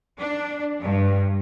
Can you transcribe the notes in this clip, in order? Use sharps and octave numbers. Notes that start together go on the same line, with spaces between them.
D4
G2